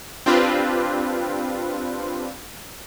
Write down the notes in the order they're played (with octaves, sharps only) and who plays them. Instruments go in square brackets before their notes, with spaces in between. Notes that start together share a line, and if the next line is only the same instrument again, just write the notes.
[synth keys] C4 D4 F4 G4 B4